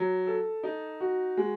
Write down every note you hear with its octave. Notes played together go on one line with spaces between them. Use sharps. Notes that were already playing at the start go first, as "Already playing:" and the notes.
Already playing: F#3
A4
D#4
F#4
G#3